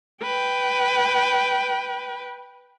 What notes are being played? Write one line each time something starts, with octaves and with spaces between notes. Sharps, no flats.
B4 G5